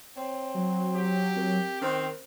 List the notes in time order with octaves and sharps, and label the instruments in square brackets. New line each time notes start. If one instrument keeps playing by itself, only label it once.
[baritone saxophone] C4 [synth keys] C#5
[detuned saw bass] F#3
[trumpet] G4
[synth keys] C4 A#4
[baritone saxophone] D#3 [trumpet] C4 [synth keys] C#4 C5 F#6